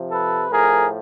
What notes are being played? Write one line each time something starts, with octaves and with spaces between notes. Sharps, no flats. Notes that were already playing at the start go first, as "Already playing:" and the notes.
Already playing: C3 F3
A4 B4
A2 F3 G#4 A#4